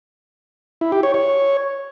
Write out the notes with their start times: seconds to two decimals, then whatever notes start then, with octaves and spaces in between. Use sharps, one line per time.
0.81 E4
0.92 G4
1.03 C#5
1.14 C#5